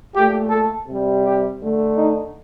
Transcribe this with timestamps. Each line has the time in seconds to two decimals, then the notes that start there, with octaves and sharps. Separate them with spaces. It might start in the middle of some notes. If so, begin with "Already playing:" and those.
0.14 A#2 A3 G4
0.50 A4
0.86 C3 G3
1.24 G4
1.60 D3 A3
1.96 D#4